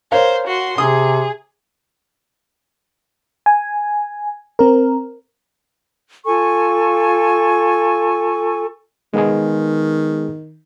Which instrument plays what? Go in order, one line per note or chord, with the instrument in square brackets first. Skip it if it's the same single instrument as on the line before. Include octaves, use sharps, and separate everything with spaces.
[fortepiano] A#4 C#5 F5 [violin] C5
[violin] F#4 C6
[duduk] C3 [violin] G#4 [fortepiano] D#6
[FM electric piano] G#5
C4 A#4
[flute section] F4 A4 G#5 C#6
[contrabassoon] D#3 [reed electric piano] G#3 B3 G#4